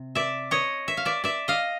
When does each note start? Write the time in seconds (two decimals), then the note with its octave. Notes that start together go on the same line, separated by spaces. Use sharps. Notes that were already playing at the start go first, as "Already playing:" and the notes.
Already playing: C3
0.15 D5 E5
0.51 C#5 D#5
0.88 E5
0.97 F5
1.05 D5 E5
1.24 D5 E5
1.48 D#5 F5